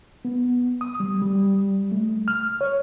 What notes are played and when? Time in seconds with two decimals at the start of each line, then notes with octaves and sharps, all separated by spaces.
0.25 B3
0.81 D#6
1.00 G3
1.22 G3
1.92 A3
2.28 F6
2.61 C#5